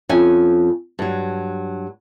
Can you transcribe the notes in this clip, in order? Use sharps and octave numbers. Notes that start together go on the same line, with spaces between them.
F2 C#4 G#5
G2 F#3